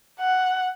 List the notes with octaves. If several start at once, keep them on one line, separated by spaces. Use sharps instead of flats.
F#5